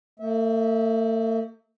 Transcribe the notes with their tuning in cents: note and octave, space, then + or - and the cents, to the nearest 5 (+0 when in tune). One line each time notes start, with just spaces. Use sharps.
A3 +45 E5 -25